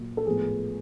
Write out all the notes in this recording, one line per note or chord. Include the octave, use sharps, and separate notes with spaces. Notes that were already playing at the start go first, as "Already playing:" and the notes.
Already playing: A#2 F#3 A#3
A4
A2 F3 G#3 B3 G#4